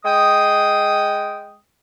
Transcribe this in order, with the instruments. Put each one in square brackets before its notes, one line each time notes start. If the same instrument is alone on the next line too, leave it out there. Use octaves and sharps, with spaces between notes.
[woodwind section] G#3 G5 D#6